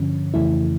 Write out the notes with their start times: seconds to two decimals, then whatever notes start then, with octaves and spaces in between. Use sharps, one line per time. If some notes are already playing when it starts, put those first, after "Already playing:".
Already playing: G2 D3 F3 C#4
0.34 F2 C#3 E3 A3 E4